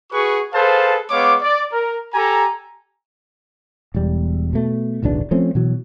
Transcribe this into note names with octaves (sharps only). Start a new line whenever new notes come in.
F#4 G#4 B4 C#6
G#4 A4 B4 C5 F5 A5
G#3 B3 C#5 F5 D6
D5
A#4
G4 A4 G#5 A#5
E1 E2 G3
B2 A3
D1 B1 E2 D4
F3 A3 C4 C#4
B2 E3 F#3